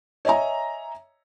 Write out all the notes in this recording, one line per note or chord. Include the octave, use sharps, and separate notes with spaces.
C#5 D#5 E5 G#5 A#5